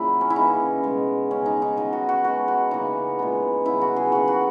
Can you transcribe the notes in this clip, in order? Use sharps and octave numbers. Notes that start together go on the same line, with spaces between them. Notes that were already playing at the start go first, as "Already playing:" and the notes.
Already playing: A#2 C#3 F#3 A#3 E4
C#4
E4
C#3 E3 A#3 D#4
B2 G#3 B3
C#3 G#3 B3 C#4
D#4
D#4
D#3 F#3 B3 D#4
F#4
F#4
D#3 G#3 B3 F#4
F#4
C#3 E3 A#3 D#4
A#2 G#3 B3
C#3 F#3 B3 E4
F#4
G#4
D#3 F#3 A#3 F#4
F#4